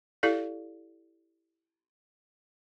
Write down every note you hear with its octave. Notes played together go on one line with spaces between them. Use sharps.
E4 G4 A4 D5 F5